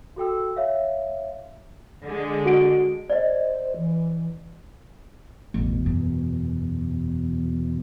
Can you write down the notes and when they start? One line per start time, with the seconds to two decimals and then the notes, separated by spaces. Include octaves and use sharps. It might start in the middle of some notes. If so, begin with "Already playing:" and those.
0.16 F#4 A4 G5 E6
0.56 C#5 E5 F5
2.04 D3 G#3
2.46 F#4 F#5 D7
3.10 C5 D5 D#5
3.77 E3
5.54 A1 E2 B2
5.86 F#2